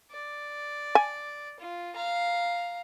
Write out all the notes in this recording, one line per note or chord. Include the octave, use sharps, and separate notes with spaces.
D5
G#5
F4
F5 A#5